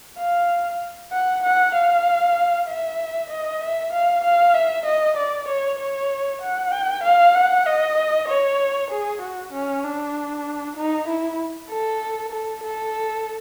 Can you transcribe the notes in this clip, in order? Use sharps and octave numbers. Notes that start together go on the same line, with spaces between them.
F5
F#5
F#5
F5
E5
D#5
E5
F5
F5
E5
D#5
D5
C#5
C#5
F#5
G5
F5
F#5
D#5
C#5
G#4
F#4
C#4
D4
D#4
E4
A4
A4
A4